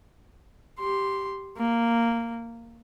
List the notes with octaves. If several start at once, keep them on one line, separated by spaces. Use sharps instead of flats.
G4 C6
A#3